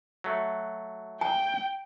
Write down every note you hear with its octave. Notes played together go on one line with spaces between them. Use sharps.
F#3 A3
G5 G#5 A#5